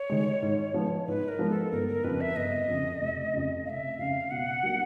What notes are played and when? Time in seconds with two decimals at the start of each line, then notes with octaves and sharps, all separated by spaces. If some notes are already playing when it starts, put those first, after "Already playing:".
Already playing: C#5
0.09 D#3 G#3
0.42 G#2
0.74 F3 G#3 B3
1.07 G#2 B4
1.28 A#4
1.39 F3 G#3 B3
1.50 A4
1.72 G1 A#4
1.88 A#4
2.04 F2 C#3 F3 B4
2.21 E5
2.36 G1 D#5
2.68 F2 C#3 F3
3.01 F1
3.33 F2 C#3
3.66 F1 F5
3.70 E5
3.99 F2 C#3 F5
4.31 B2 F#5
4.63 F#3 A#3 D4